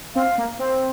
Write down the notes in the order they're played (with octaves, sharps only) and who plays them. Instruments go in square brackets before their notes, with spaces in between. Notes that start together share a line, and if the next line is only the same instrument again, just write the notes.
[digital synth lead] C4 [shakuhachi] F5
[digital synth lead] A#3
C4